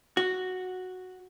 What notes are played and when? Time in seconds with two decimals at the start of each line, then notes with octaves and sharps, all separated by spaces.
0.17 F#4